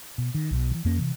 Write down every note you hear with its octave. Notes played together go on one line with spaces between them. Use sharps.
B2
D#3
B1 B2
D#3 E3
F2 A#3 C#4
C3 E3